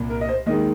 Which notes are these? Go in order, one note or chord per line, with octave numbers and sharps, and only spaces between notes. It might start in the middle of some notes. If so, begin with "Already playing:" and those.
Already playing: C2 A#2
A#4
D#5
C5
D#2 D#3 G#3 D#5